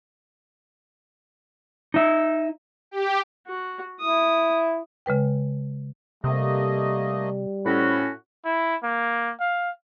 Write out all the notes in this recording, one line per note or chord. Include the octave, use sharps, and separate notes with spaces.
D#4 E5
G4
F#4
E4 D#6
C#3 G#3 B4 G5
C3 G3 A3 A#3 D#5
A2 C4 C#4 F#4 B5
E4
A#3
F5